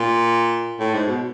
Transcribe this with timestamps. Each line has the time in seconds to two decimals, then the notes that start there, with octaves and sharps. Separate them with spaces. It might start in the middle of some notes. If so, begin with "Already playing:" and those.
Already playing: A#2
0.80 A2
0.94 G#2
1.07 B2